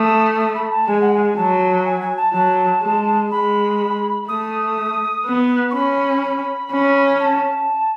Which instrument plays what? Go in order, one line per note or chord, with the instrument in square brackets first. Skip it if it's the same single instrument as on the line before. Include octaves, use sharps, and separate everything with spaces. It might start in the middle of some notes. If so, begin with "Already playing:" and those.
Already playing: [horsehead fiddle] A3 [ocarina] D#6
[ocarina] D#6
B5
A5
[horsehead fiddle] G#3 [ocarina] G#5
[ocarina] F#5
G#5
[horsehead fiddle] F#3 [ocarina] A5
[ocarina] G#5
G#5
A5
[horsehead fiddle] F#3 [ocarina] A5
[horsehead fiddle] G#3
[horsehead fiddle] G#3 [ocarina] B5
[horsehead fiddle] A3 [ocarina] D#6
[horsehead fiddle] B3
[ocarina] C#6
[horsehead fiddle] C#4 [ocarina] B5
[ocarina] B5
[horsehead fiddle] C#4
[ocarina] A5